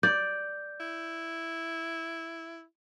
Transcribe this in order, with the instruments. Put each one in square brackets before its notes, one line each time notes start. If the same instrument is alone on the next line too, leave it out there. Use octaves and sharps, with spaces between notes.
[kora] D5 [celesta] G6
[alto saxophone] E4